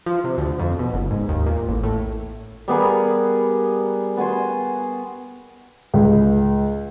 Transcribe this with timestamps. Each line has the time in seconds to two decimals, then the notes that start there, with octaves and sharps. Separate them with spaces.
0.06 F3
0.24 C3
0.38 D2
0.59 F2
0.79 B2
0.94 F#1
1.11 G#2
1.29 D#2
1.46 A#2
1.69 A1
1.83 A2
2.68 G3 B3 G#4 A#4
4.17 B3 F#4 G#5 C6
5.94 C#2